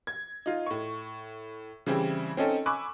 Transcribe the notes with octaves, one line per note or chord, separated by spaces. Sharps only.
G#6
D#4 F4
A2 C#6
C#3 E3 G3 C4 E4
C4 C#4 D#4 A4
G#5 B5 C#6 D6 E6 F#6